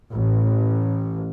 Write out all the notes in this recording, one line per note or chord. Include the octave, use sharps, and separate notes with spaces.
A1